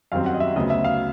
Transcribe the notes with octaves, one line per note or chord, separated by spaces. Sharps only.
F#2 D#3 G3 C4 F5
F#5
D#5
E5
D2 C#3 F#3 B3 D#5
E5
F5